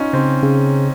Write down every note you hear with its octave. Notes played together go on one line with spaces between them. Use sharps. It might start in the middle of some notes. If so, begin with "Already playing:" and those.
Already playing: C#4 D#4 F4
C#3 C4
C#3